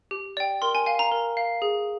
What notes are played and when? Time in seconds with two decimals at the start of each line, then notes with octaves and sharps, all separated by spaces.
0.11 G4
0.37 D5 G5
0.62 A#4 C6
0.75 G#5
0.86 F5 G#5
0.99 A#5
1.12 A#4
1.37 F5
1.62 G#4